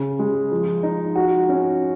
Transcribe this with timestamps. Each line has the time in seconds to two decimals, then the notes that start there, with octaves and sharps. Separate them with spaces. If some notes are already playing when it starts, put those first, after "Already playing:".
Already playing: C#3
0.19 G#3
0.52 F3
0.83 D#4
1.15 F#4
1.49 C#4